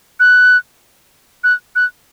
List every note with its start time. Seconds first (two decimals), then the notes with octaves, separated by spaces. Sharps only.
0.20 F#6
1.44 F#6
1.76 F#6